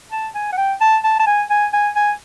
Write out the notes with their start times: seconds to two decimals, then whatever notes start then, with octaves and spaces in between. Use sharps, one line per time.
0.12 A5
0.35 G#5
0.52 F#5
0.57 G5
0.81 A5
1.04 A5
1.19 A5
1.27 G#5
1.50 G#5
1.73 G#5
1.95 G#5